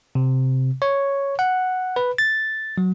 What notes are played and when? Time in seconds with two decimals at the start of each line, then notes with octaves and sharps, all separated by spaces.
0.15 C3
0.82 C#5
1.39 F#5
1.96 B4
2.18 A6
2.78 F#3